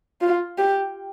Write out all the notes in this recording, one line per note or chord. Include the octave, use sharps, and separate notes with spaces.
F4
G4